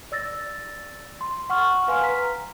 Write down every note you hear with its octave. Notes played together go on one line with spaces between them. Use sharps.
D5 E6 A6 A#6
C6
F#5 C#6 F6
B4 F5 G#5 C6 F6
B4 A#5 B6